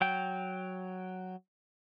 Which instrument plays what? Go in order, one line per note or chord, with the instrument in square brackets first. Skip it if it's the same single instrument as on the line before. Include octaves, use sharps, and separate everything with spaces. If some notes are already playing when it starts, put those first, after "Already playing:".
[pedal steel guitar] F#3 G5